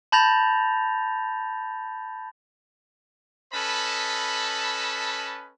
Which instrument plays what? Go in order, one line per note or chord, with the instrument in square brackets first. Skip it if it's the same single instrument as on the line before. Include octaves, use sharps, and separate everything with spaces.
[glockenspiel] A5 B5 G6 A6 A#6 F7
[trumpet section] C#4 A4 B4 D#5 A5 B5